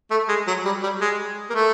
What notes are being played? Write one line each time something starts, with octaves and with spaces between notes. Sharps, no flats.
A3
G#3
F#3
G3
G3
G#3
A#3
A3